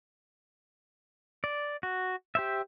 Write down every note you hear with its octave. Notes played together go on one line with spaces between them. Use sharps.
D5
F#4
G4 C5 E5